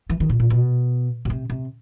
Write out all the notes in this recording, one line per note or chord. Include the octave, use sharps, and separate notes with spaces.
E3
D#3
A#2
A#2
B2
B2
C3
C3